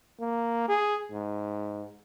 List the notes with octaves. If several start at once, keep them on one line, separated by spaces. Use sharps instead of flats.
A#3
G#4
G#2